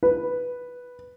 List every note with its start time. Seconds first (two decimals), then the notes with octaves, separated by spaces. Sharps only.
0.03 B4